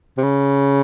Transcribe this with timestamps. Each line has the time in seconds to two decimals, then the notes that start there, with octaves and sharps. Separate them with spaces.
0.17 C3
0.23 C#3